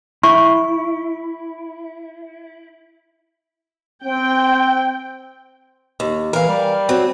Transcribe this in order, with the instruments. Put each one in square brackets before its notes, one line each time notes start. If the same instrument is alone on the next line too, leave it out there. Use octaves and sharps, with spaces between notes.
[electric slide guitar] E4 [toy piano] C#6
[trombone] C4 [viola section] G5
[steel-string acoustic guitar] D#2
[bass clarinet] E3 [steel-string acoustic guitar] A#4 F5
[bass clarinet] G3
[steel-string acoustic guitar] F#3 C4